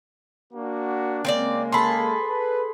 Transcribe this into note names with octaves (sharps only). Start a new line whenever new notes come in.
A#3 D4 F#4
C#3 G#3 A#3 C4 C#5 D5
G#4 A4 B5 C6
B4